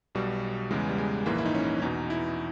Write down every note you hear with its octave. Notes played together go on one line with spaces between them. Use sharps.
B1 B2 G3
E2 C#3 E3 G#3
G3
G#3
A#1 G#2 E3 A#3
E4
D#4
C#4
C#4
E2 B2 D#4
E4